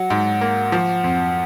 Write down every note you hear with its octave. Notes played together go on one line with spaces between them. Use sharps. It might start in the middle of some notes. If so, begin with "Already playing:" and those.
Already playing: F#3 F#5
G#2
A#3
F3
F2